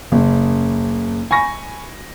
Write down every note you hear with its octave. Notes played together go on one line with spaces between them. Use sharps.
F#1
G#5 B5 C#6 A#6